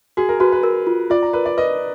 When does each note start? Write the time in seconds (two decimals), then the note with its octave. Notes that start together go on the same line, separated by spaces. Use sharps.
0.17 F#4 G#4
0.29 A#4
0.40 F#4 B4
0.52 B4
0.63 A#4
0.87 F4
1.10 F4 D5
1.23 A#5
1.33 A#4 B4
1.46 D5
1.57 B4 D#5